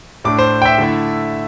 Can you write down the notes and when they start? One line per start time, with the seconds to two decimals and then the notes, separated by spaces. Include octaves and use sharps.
0.24 A2 A3 D4 D6
0.39 C5
0.62 G5
0.65 E5
0.78 D3 A3 E4